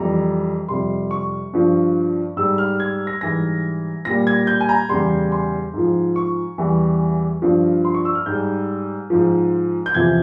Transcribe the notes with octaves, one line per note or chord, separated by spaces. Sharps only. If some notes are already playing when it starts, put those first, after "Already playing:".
Already playing: F2 E3 G3 A#5
F2 C3 G3 C6
C#6
G2 F3
G#2 G3 E6
F6
G#6
A#6
G#2 E3 G3 A#6
A#2 G3 A#6
G#6
G6
G#5
A#5
E2 C#3 G3 C6
C6
G#2 F3
C#6
E2 E3 G3
G2 F3
C6
C#6
E6
F6
G#2 G3 G6
G#2 F3
G6
E2 C3 F3 G#6